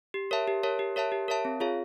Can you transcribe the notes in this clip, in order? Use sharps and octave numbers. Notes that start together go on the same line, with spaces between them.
G4
A#4 C#5 E5 A5
G4
A#4 C#5 E5 A5
G4
A#4 C#5 E5 A5
G4
A#4 C#5 E5 A5
C4
F4 G#4 C#5 F5